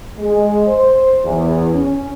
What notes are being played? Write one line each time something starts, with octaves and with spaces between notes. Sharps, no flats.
G#3
C5
E2
C#4